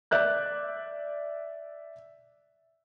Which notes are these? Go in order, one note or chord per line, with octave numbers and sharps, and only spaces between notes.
D5 E5 F#6 G6